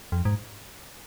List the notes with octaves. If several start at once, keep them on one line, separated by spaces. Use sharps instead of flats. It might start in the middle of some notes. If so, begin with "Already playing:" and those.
F2
G#2